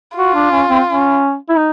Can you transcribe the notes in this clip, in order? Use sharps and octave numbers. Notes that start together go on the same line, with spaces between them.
F4 F#4
D4
C#4
C4
C#4
E4
D#4